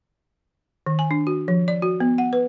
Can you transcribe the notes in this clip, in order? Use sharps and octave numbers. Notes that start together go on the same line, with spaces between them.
D#3
G#5
D4
F#4
F3
D5
F#4
B3
F#5
B4